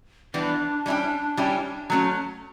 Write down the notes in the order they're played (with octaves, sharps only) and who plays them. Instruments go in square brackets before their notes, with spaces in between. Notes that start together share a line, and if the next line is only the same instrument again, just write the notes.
[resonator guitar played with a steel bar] E3 G3 B3 [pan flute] D4
[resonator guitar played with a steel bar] G3 C#4 E4 G4
G3 C#4 E4 G4
F#3 A3 C#4